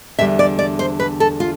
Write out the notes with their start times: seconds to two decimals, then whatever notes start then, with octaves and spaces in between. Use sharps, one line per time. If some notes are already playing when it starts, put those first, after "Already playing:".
0.18 E2 D3 G3 E5
0.39 D5
0.59 D5
0.79 C5
1.00 B4
1.20 A4
1.40 F4